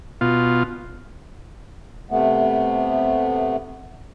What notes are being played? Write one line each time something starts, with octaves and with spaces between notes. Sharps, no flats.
B2 F4
C3 A3 B3